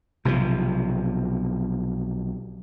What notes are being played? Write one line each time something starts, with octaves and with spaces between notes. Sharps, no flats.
B1 C3 E3 F3